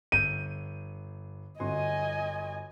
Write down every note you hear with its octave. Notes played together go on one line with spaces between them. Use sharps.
G1 G6 D#7
G1 F#4 D#5 G#5 C6